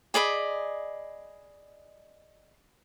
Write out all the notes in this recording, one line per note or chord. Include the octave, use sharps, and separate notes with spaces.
G#4 D5 D#5 B5